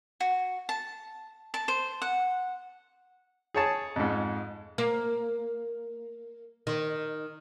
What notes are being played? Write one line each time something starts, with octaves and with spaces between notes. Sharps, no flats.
F#4
A5
A5
C5
F#5
G#4 C#5 A5
F2 G#2
A#3
D#3